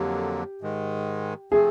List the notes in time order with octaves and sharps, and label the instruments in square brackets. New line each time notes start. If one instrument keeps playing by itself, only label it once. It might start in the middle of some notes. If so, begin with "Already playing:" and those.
Already playing: [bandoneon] F2 D3 F#3 A#3 [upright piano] G4
[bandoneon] G#2 D#3 G#3
[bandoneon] C3 F3 A3 C4 [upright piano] G#4